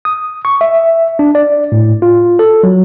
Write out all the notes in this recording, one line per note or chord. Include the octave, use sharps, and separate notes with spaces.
D#6
C#6
E5
D4
D5
A2
F4
A4
F#3